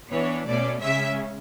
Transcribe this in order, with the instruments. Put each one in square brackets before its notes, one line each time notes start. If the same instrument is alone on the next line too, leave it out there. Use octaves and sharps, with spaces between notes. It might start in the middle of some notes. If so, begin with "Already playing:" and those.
[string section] E3 B3 D4 C#5
B2 A3 C#4 D5
C#3 G#3 C#4 E5